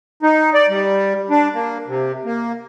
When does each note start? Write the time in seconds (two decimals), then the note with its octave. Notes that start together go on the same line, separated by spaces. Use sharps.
0.23 D#4
0.54 D5
0.69 G3
1.30 D4
1.54 A#3
1.88 C3
2.25 A#3